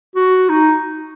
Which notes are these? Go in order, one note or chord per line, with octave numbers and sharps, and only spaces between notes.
F#4
D#4